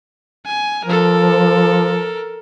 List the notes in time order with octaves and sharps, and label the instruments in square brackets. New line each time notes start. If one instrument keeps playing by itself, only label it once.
[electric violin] G#5
[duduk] F3 [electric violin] A4 A#4